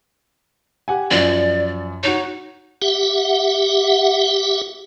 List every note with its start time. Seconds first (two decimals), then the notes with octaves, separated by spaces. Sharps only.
0.88 G4 F#5 G#5
1.11 F#2 F3 D5
2.03 D#4 F#4 C#5
2.82 G4 E5 F#5